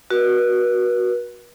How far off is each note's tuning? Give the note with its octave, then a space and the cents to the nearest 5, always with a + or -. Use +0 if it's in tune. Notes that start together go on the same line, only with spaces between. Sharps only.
F#4 +0 B4 -45